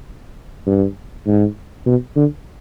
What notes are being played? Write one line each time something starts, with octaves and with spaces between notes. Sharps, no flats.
G2
G#2
B2
D3